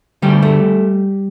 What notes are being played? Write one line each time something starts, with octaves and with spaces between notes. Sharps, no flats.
D2 G3 G4
A3